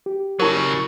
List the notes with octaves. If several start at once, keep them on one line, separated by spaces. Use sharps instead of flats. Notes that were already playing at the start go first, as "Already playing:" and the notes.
G4
C#3 F#3 E4 A#4